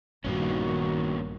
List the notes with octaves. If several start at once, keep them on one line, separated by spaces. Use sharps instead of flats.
A#1 G2 A#2 D#3 A#3 B3 C#4 F#4